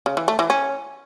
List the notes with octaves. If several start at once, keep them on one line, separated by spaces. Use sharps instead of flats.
C#3
E3
A3
E3
C#4